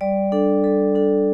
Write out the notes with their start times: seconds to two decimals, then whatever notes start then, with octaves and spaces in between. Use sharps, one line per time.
0.01 G3 D5
0.32 D4 A4
0.64 G3 A4
0.95 D4 A4